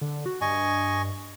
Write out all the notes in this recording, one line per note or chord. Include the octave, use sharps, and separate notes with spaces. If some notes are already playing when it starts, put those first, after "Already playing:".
D3
F#4
G2 D#5 G#5 C#6